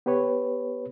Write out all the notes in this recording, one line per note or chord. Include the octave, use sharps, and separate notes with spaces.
B3 G4 B4 C#5